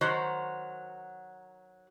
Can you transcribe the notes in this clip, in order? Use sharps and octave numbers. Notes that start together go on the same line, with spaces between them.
D#3 F#3 F#4 C5